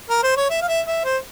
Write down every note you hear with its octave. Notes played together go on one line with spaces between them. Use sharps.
A#4
C5
C#5
E5
F5
E5
E5
C5